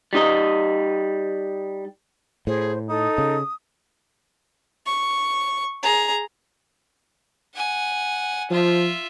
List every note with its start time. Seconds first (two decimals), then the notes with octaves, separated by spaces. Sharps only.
0.13 G3 D#4 D#5
2.47 A2 G#4 C5
2.89 D#4 A4 D#6
3.18 C#3
4.86 C#6
5.83 G#4 A#5
7.55 F#5 G#5
8.50 F3 F4 E5